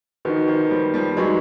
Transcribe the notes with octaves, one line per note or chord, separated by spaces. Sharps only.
D#3 F3 D#4 F#4 B4
D#3 F3
F3 G3
F3 G3
F#3 G#3 D#4 F#4 B4